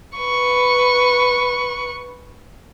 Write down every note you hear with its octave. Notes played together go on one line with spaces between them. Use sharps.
B4 C#6